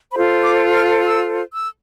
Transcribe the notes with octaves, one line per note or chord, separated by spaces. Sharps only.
F4 A4 C5 B5
D6
F6
E6
E6